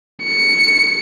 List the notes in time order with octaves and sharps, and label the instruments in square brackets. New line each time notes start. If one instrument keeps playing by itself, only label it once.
[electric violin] C#7